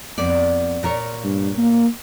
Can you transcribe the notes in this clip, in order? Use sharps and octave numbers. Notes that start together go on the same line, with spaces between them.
F2 B3 D5
A#2 A#4 C#5
G2
A#3